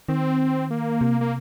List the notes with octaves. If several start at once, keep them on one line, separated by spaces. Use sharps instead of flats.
D#3 C4
A#3
C3
A#3